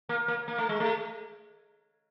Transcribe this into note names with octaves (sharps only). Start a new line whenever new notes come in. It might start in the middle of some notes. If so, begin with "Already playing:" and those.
A#3
A#3
A#3
A3
G#3
A3